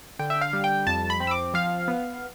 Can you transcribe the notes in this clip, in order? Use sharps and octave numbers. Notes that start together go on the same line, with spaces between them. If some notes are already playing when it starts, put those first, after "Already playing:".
D3 G5
E5
F5
G3
G5
F2 A5
B5
C4
E6
D6
F3 F5
B3